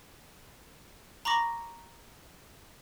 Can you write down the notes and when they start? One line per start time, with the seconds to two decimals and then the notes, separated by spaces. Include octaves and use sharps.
1.25 A#5 B5 C#6 D6 A#6